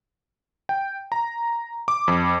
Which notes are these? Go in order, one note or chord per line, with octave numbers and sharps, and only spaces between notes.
G5
A#5
D6
F2